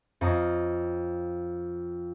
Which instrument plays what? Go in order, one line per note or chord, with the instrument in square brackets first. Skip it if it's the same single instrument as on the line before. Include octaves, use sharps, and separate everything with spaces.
[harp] F2 F4 C#5 D#5 A#5 D#6